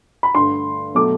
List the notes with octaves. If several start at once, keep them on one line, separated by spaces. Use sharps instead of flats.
B5
G2 D3 A3 C6
B2 F#3 A3 D6